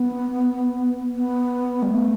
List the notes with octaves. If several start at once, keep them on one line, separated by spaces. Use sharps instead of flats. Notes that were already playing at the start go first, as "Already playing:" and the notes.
Already playing: B3
B3
G3
A3